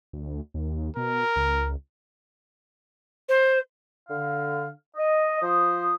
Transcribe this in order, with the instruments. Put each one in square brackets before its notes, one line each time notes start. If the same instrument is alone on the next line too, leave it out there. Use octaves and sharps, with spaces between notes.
[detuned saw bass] D2
D#2
[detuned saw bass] B2 [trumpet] A#4
[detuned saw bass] C#2
[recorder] C5
[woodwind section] D3 F5
D#5
F3 C5 D#6